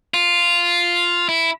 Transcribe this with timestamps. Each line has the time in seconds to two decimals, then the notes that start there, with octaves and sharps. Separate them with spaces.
0.14 F4
1.29 E4